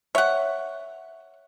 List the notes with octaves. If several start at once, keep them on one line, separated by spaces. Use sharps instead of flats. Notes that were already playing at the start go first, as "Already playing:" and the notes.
C#5 E5 F#5 G5